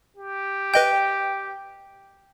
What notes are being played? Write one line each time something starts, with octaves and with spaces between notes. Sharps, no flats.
G4
B4 D#5 G5 G6